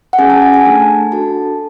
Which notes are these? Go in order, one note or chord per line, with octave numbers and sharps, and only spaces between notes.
F#5
C#4 G#4 G#5
A5
A5
G#5
A3 D4 A4 A5
D4 F#4 A4 A5